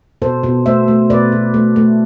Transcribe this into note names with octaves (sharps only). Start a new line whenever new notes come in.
B2 A4 C5
B2
A3 C5 E5
A3
B2 B4 D5
B2
A3
A3